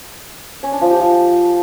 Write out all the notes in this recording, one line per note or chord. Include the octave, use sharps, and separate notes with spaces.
C#4
D4
F3
G4
F3